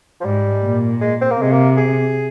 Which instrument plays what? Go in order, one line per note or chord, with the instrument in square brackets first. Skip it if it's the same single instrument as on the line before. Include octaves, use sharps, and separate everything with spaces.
[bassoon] F3
[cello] G#2 [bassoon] G3
[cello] A#2
[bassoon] G#3
C4
A#3
[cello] C3 [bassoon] G#3
[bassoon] A#3
G#4